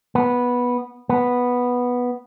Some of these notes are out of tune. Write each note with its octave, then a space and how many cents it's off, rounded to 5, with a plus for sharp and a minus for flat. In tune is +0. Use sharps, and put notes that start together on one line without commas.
B3 -10
B3 -5